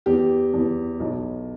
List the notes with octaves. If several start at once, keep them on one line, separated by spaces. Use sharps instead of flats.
E2 G4
E2
B1